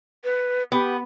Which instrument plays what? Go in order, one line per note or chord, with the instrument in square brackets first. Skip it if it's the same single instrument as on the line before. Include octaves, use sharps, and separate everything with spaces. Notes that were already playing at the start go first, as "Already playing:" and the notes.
[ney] B4
[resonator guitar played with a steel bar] B3 [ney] G4